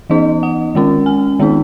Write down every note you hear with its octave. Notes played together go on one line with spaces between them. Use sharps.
E3 B3 D#4 D#5
F#5
D#3 G#3 C#4
G#5
D#3 G#3 B3 D#4